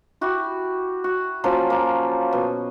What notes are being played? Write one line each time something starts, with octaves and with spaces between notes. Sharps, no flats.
E4 F#4 G4
F#4
F3 F#3 A#3 C#4
A#3
B2